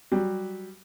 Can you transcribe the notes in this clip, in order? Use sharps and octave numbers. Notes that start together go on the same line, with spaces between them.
F#3 G3